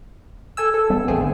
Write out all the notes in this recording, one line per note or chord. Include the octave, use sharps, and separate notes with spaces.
A4 G#5 E6
A4
G3 B3
G#1 A3 B3 C4 G#4
D3